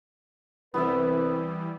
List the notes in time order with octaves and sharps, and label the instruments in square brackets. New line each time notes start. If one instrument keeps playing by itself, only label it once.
[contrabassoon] C2 [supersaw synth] E3 G3 [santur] B3 E5 [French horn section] B4